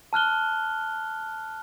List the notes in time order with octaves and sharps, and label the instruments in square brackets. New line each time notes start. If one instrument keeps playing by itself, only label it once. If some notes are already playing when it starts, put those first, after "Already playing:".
[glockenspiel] A5 F6 F#6 G7